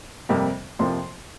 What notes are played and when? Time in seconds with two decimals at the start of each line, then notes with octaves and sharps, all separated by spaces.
0.29 F2 C3 G3 A#3
0.79 F2 C3 F3 A#3 C6